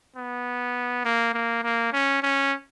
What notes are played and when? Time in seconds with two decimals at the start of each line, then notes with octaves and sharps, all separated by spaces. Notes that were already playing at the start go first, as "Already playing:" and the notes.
0.17 B3
1.05 A#3
1.34 A#3
1.64 A#3
1.93 C#4
2.23 C#4